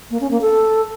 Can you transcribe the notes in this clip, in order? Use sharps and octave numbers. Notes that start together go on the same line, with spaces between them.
A#3
C#4
A#3
A4